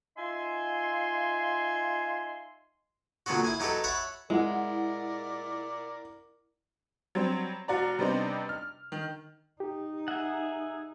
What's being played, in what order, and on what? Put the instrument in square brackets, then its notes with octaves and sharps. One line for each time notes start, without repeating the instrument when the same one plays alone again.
[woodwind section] D#4 F4 E5 G#5 C6
[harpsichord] A#2 D3 F#3 B3 C4 F#4
E4 G#5
F#3 D#4 G4 A4 B4
C#5 E5 F#5 A5 B5
[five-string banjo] G#3 [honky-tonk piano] E4 F#5 [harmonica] A#4 D5
[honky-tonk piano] F#3 G3 C4
F1 F#4 D5 A#5
C3 G3 B3 C4 D4 D#4
F6
D#3
[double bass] D#4 [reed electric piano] G4
[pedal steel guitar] G#4 E5 F#5